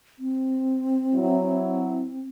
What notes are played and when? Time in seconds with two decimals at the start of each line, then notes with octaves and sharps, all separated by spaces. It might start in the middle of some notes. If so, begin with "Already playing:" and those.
0.19 C4
1.15 F#3 E4